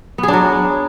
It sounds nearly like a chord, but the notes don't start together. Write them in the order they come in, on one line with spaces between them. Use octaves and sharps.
B3 G#4 D4 F#3